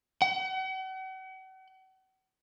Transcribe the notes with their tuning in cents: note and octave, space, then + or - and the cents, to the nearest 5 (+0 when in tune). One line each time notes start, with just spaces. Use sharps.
F#5 +40